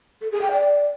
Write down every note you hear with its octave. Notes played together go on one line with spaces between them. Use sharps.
A4
G#4
G5
D5